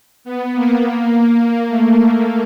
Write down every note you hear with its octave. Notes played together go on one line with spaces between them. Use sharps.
B3
A#3
A#3
A3